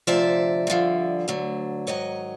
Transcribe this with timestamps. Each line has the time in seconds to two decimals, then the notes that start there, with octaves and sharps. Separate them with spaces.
0.07 D2 C3 F3 D5 E5
0.67 G2 D3 F3
1.28 D2 D3 F#3
1.87 G#2 D#3 F#3 C#5 D#5